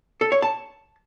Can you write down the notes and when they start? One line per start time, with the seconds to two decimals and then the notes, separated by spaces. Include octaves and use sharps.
0.21 A4
0.32 C#5
0.42 A5